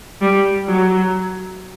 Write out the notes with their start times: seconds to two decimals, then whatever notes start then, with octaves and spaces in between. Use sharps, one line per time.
0.21 G3
0.67 F#3